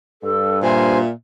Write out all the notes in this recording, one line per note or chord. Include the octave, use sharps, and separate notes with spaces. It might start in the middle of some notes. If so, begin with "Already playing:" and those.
G2 A4
A#2 C5 E5 G#5